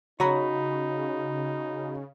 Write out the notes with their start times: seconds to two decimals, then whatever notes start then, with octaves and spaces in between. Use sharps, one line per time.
0.20 C#3 D#4 F#4 C#5 A#5 B5